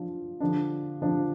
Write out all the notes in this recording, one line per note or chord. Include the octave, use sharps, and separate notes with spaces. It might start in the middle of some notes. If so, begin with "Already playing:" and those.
Already playing: F3 D4 F4
D3 F3 D4
D3 F3 D4